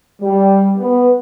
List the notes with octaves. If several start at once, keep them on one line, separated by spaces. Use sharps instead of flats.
G3
B3